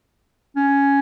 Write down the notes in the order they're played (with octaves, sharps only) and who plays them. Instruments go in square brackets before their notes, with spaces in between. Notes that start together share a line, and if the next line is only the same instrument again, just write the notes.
[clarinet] C#4